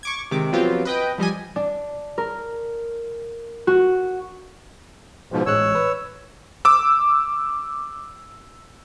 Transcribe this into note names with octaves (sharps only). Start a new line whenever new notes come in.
C#6 D6 G#6
C3 D#3 G#3 D6
F3 F#3 B3 C4 F4 G4
B4 D#5 G5
F3 G3 D#5 G#5
D4
A#4
F#4
G#2 B2 F3
A1 G#3 C#5 E6 F#6
B4
D6 E6